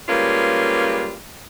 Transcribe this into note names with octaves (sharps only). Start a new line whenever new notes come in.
G3 G#3 A#3 C#4 F4 B4